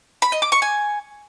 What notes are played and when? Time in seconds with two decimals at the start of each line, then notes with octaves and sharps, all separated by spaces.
0.22 B5
0.32 D#5
0.42 D6
0.52 C#6
0.62 G#5